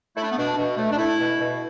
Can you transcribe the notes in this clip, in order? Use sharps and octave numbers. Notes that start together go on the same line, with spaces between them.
A3 E4
D4
B3
B2 D4
B2
A3
D4
A3 E4
B2
B2